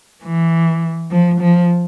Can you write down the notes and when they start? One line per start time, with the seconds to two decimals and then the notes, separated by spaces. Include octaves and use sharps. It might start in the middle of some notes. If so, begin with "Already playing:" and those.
0.24 E3
1.12 F3
1.41 F3